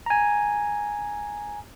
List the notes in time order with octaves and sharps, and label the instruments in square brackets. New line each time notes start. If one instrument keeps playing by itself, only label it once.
[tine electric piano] G#5 A#5